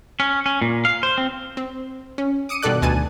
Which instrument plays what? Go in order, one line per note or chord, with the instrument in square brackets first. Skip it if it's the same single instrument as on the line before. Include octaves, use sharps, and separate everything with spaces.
[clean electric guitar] C#4
C#4
A#2
F5
C5
C4
[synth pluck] C4
C#4
D6 D#6 C#7 D#7
G2 B2 D#3 A4 D5 F#6
D2 B2 G#5 A5 D#7